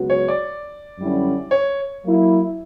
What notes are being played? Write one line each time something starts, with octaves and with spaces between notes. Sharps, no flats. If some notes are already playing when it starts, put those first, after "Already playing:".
Already playing: C#2 C#3 F#3 B3 F#4
C#5
D5
F#2 D3 G3 C#4 E4
C#5
F#3 A#3 E4